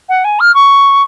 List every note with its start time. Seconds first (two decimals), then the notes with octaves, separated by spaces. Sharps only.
0.09 F#5
0.24 G#5
0.40 F6
0.54 C#6